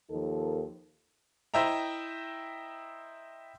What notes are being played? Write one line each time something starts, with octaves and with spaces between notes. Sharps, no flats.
D#2 F3 D#4 A4 A#4
E4 C5 D#5 E5 G5 A#5